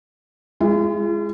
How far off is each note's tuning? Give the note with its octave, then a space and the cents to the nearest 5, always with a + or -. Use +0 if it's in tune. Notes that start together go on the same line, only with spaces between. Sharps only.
G#3 +0 F4 -45